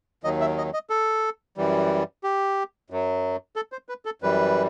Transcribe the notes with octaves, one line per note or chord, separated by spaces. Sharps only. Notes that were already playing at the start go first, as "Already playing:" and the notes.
D#2 D#3 F#3 D#5
E5
D#5
D#5
A4
F#2 E3 G3
G4
F#2 F#3
A4
C5
B4
A4
F#2 E3 G3 B4